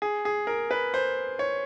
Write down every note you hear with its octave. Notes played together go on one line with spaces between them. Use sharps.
G#4
G#4
A#4
B4
C5
C#5